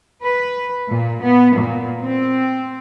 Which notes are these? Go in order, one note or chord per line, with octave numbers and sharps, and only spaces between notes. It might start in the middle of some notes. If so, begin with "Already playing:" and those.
B4
A#2
B3
A#2
C4